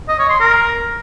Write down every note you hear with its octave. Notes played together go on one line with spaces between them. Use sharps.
D#5
C#5
C6
A#4